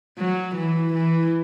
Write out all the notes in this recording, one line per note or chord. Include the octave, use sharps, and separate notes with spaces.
F#3
E3
E3